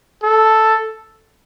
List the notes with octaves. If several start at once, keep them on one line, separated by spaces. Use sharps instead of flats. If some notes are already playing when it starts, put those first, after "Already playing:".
A4